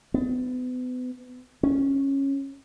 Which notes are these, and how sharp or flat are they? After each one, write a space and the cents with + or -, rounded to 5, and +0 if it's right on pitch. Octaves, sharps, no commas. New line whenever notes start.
B3 +35
C#4 -15